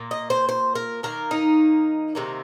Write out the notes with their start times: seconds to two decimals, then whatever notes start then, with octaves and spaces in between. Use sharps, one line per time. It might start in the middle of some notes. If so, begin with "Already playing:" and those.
Already playing: A#2 A#3
0.11 D#5
0.30 C5
0.49 C5
0.75 A#4
1.03 D#3 A#3 A#4
1.31 D#4
2.15 C3 D#3 A#3